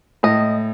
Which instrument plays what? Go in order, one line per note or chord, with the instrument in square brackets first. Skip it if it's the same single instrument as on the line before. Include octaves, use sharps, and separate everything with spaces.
[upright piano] A2 [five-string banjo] D#5